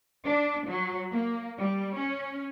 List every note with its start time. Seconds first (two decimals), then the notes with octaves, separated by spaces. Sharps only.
0.25 D4
0.67 F#3
1.11 A#3
1.58 G3
1.96 C#4